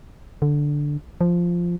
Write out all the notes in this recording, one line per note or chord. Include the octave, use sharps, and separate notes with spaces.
D3
F3